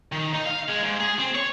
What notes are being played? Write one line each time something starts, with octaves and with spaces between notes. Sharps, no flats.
D#3
D#4
F5
G#3
G#2
G#4
C4
C#5